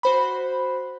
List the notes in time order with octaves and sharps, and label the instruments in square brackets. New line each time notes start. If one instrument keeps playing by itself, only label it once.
[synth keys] F#4 C5 B5